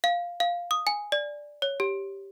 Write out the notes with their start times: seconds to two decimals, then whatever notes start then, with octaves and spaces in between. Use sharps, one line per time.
0.04 F5
0.40 F5
0.71 D#6
0.87 G#5
1.12 D5
1.62 C#5
1.80 G4